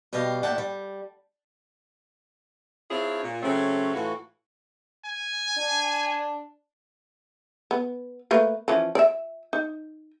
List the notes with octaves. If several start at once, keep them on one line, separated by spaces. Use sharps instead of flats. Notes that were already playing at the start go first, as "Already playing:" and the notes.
B2 G3 G4 D#5 F5
D#2 A2 D5 F#5 G5 A5
G3
C4 D4 E4 F4 G#4 C#5
A#2
C#3 F#3 A3 C4 C#4
A2 E3 F4 F#4
G#5
D4
B3
A3 A#3 B4
E3 F3 C#4
D5 E5
D#4